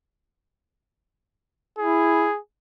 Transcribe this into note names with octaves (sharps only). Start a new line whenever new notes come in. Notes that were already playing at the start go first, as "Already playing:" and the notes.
E4 G#4